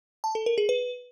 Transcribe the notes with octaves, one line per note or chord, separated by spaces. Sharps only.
A5
A4
A#4
G#4
B4